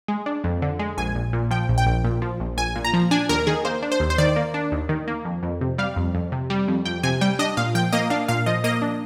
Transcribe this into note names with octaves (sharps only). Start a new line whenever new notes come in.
G#3
D4
F2
D3
G#3
A#1 G#5
A#1
A#2
F3 G5
A#1
G5
A#1
A#2
F3
A#1
A#1 G#5
A#2
A#5
F3
D4 G#5
D#2 A#4
D#3 G#4
A#3 C5
D4
C5
D#2
C5
D#3 D5
A#3
D4
D#2
D#3
A#3
F2
F2
C3
G3 F5
F2
F2
C3
G3
F2
F2 G5
C3 G#5
G3 G5
D4 D#5
A#2 F5
F3 G5
A#3 D#5
D4 F5
A#2 F5
F3 D#5
A#3 D#5
D4